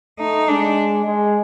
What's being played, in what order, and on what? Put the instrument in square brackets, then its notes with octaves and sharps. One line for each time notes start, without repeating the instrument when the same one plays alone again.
[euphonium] A3 [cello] D#4
[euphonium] G#3 [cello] D4
[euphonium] G#3